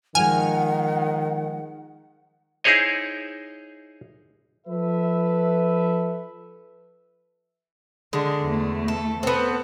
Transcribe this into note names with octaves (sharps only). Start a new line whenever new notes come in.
D#3 F3 G#3 F#5 G#5 F6
D#4 E4 G#4 C5 C#5 D#5
F3 A4 B4 E5
D3 G#3
E2 A3
A4
B3 C4 A4